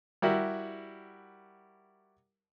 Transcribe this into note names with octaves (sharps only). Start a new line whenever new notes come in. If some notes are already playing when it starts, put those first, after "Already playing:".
G3 E4 F#4 A#4